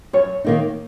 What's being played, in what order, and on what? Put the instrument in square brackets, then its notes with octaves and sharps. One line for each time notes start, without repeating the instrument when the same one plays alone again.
[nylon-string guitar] F#2 [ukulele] C#5
[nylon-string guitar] D#3 A#3 D#4